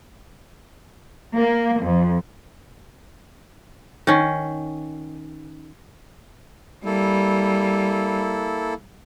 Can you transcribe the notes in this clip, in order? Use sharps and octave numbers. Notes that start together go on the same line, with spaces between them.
A#3
F2
D#3 C#4
G3 A#3 E4 A4